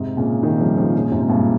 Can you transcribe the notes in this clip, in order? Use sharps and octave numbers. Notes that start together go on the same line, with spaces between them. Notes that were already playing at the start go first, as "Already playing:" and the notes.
Already playing: G#2 C3
A#2 C#3
C3 D#3
G3
C#3 F3
C#3 F3
A#2 C#3
G#2 C3
G2 A#2